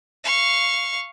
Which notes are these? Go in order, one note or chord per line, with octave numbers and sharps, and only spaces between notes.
F5 C#6